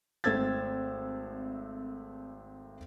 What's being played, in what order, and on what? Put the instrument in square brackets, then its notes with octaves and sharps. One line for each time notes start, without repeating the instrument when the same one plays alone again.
[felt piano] G#1 A3 C4 E6 G#6 A6